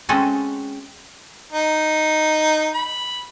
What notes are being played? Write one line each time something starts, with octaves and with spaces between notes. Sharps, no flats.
G#3 C4 C#4 F#4 G#4 A4
D#4
B5